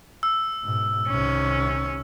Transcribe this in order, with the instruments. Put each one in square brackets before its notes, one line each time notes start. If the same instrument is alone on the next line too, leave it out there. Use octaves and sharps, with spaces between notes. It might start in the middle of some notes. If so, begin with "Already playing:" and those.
[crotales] E6
[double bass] G#2 B2
[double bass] C2 C3 [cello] D#3 C#4